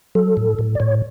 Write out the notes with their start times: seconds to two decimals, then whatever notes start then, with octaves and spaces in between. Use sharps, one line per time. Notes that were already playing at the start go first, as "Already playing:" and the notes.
0.15 F#3 A4
0.37 A2
0.59 A2
0.75 D5
0.80 A2 C#5